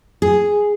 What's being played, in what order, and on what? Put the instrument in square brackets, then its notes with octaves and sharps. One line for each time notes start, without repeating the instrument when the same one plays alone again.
[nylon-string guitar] G#4